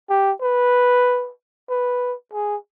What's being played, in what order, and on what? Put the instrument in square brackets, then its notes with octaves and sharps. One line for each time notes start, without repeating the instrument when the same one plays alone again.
[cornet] G4
B4
B4
G#4